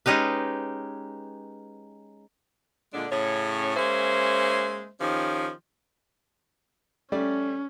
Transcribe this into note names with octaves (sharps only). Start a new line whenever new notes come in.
G#3 C#4 D#4 G4 B4
A#2 D3 G#3 D4
A2 C#3 C#4 C#5
G#3 A#3 C#4 C5 E5
D#3 F3 C#4 G4
G3 A3 C#4 D5